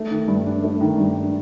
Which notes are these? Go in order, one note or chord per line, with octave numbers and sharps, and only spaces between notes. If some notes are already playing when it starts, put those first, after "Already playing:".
Already playing: A3
D#3
G2
D4
A3
D#3
G2
D4